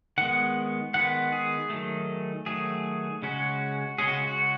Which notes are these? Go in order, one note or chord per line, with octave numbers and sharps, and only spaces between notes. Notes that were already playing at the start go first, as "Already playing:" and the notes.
D#3 G#3 B3 F#5
D#3 G#3 B3 F#5
G#4
D#3 F#3 A3
D#3 F#3 A3 G#4
C#3 G#3 C#4 F#4
C#3 G#3 C#4 G#4
F#4
F#4